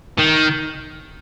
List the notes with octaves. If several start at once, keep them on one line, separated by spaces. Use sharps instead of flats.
D#3